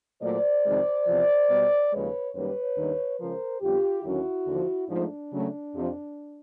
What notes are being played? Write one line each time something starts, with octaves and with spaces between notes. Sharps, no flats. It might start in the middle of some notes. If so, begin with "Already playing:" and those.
A#2 F#3 A3 C5 D5
F2 C3 D#3 G#3
E2 C3 F3
B2 G3 B3
D#2 C#3 F3 G#3 B4 C#5
F#2 D#3 G3 A#3 B4 C#5
D#2 D#3 G3 A#3 D4
C#3 F3 G#3 A#4 C5
F2 D3 G3 B3 F4 G4
D#2 D3 F#3 A#3 C#4 E4 F#4
D#2 D3 F3
G#2 F3 A3 D4
C#3 F#3 A3
F2 C3 F3